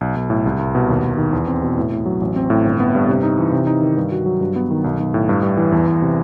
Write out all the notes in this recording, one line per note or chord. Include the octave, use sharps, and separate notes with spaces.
B1
B1
A2
C2
C2
B2
D#2
D#2
D#3
E2
C4
B2
A2
A2
F#3
A1
C4
A2
G1
B3
G2
C3
D#4
E3
C3
D#4
D#3
G2
F#4
F#3
G2
B3
D#3
B1
B1
A2
G2
G2
E3
E2
E2
C3